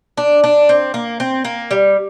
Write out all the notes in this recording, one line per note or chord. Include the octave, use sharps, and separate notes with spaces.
D4
D4
C4
A#3
C4
A#3
G3